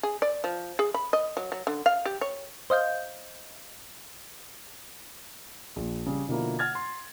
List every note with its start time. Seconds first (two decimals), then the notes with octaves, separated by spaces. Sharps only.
0.03 G#4
0.22 D5
0.44 F3
0.79 G#4
0.94 B5
1.13 D#5
1.37 F#3
1.52 F#3
1.67 D3
1.86 F5
2.05 G4
2.21 C#5
2.70 C5 D#5 F5 G6
5.76 A#1
6.06 C#3 G3
6.28 B2 D3 F3 A#3 E4
6.59 F#5 F6 G#6 A6
6.75 C6